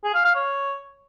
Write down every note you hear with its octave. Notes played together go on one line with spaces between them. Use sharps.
G#4
F5
F5
C#5